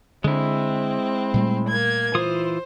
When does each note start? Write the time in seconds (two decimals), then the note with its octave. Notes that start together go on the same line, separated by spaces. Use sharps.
0.24 D3 G#3 C4 E4
1.34 A#2 G3 A3
1.69 A#3 G#6
2.15 E3 F4 C5 D#6